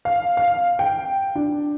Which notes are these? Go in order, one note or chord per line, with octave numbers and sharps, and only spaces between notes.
F5
F5
G5
D4